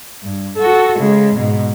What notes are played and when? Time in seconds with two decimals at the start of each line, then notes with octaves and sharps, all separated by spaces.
0.23 G2
0.57 F#4 A4
0.99 C#3 G#3
1.35 G#2 B2